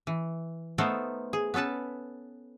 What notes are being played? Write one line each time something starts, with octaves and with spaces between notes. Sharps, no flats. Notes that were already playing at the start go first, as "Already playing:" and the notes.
E3
A3 B3 D#4 A4 A#4 C5
G#4
B3 C#4 A4 B4 A5